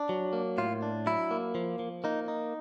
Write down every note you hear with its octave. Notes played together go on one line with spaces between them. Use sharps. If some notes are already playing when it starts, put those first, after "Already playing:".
Already playing: D4
F#3
A#3
A2 F4
D4
F#3 E4
A#3
F3
F3
A#3 D#4
D#4